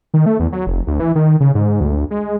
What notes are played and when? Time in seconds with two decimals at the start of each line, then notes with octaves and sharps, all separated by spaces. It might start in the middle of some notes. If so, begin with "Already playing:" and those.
0.14 D#3
0.26 A3
0.40 E2
0.52 F#3
0.67 F1
0.87 D2
1.00 E3
1.15 D#3
1.40 C#3
1.55 G#2
1.81 D2
2.11 G#3